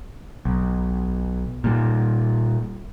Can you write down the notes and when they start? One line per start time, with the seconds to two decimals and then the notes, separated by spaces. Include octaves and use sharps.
0.45 B1
1.64 A#2 G3